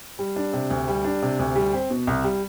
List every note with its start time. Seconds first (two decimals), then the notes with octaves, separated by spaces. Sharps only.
0.19 G3
0.36 D4
0.53 C3
0.70 D2
0.88 G3
1.04 D4
1.22 C3
1.39 D2
1.56 G3
1.73 C4
1.90 B2
2.07 C2
2.24 G3